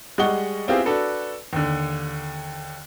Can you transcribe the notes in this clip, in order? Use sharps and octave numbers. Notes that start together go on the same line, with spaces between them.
G3 G#3 D#5 F#5 C#6 G7
B3 C4 E4 F4 G4 G#4
D4 F#4 A4 B4
D#2 D3